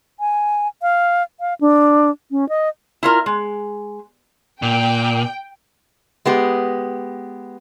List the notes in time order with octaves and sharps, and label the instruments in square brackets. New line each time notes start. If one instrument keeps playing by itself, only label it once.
[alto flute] G#5
F5
F5
D4
C#4
D#5
[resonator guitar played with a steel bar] E4 F4 A#4
G#3
[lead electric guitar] A#2 [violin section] G5
[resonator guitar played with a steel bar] G#3 B3 G4